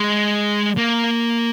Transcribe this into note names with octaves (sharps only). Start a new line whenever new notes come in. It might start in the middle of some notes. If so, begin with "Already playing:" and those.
Already playing: G#3
A#3